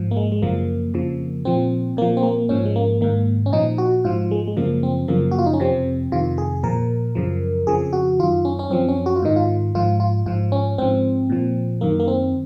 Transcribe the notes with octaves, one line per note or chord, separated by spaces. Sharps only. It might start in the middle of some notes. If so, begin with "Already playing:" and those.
Already playing: G#2 F3
A#3
G#3
G#3
F#2 C#3 F3 A#3
F2 C#3 F3
A#2 F3 C4
A#2 F3 A#3
C4
A#3
G#2 F3 C#4
G#3
A#3
G#2 D#3 A#3
C#4
A#2 F3 D#4
F#4
G#2 F3 F4
G#3
G#3
F#2 C#3 F3 A#3
C4
F#2 C#3 F3 A#3
F#4
F4
D#4
C#4
F2 C3 F3 C4
F2 C3 D#3 F4
G#4
A#2 F3 A#4
F#2 C#3 F3
F2 C#3 F3 G#4
F#4
F#2 D#3 F4
C#4
C#4
F#2 F3 C4
C#4
F#4
F4
G#2 D#3 D#4
F4
G#2 F3 F4
F4
G#2 F3 F4
C#4
G#2 F3 C4
A#2 F3
F#2 D#3 A#3
A#3
C4